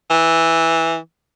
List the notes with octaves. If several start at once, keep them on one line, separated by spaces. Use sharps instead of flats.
E3